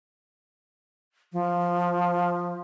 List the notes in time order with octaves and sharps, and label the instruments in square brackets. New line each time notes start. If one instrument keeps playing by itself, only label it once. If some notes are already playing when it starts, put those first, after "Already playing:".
[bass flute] F3